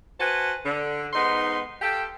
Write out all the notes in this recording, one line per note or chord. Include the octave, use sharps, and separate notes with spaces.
F#4 B4 C5 G#5 A5
D3
G#2 B3 D#4 C6
G4 A4 F5 G5